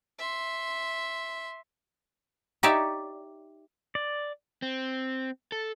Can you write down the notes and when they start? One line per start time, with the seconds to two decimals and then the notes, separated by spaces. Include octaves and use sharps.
0.19 E5 C6
2.63 D#4 G4 C#5 D5 E5
3.95 D5
4.62 C4
5.52 A4